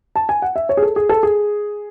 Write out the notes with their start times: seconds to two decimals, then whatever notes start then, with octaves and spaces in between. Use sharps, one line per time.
0.16 A5
0.29 G#5
0.42 F#5
0.56 E5
0.69 C#5
0.77 G#4
0.82 A4
0.96 G#4
1.09 A4
1.23 G#4